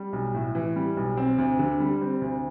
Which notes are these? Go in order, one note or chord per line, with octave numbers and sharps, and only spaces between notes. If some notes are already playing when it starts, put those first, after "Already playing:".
Already playing: G3
B1
A2
E3
G3
B1
C4
D2
D3
G3
C4
D2